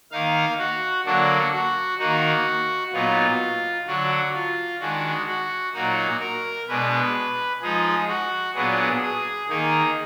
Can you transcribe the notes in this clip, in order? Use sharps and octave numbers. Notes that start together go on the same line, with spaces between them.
D#3 A#3 D#4 F5
F#4
D3 F#3 A#3 D4 F#4
F#4
D#3 A#3 D#4 F#4
A#2 F#3 B3 D#4 F4
D3 F#3 D4 F#4
F4
D#3 G#3 D4 F#4
F#4
A#2 F#3 A#3 D#4 F#4
A#4
B2 G#3 D4 B4
F3 G#3 D#4 G#4
F#4
A#2 F#3 B3 D4 G#4
G#4
D#3 A#3 D#4 G#4